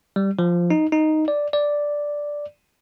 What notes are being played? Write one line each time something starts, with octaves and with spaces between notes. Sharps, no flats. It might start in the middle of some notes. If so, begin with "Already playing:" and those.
G3
F3
D#4
D#4
D5
D5